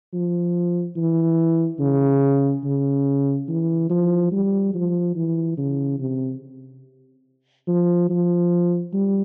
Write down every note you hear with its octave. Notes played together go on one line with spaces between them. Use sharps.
F3
E3
C#3
C#3
E3
F3
G3
F3
E3
C#3
C3
F3
F3
G3